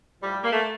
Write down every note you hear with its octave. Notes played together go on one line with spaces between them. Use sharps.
A2 F3 G3
A#3
A3